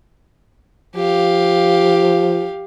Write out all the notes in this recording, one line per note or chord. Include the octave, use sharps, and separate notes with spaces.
F3 G4 F5